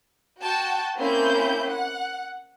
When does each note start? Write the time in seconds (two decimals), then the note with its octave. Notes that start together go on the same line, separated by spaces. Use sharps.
0.40 F#4 G5 A5
0.96 A#3 C4 C#4 E4 G6
1.68 F#5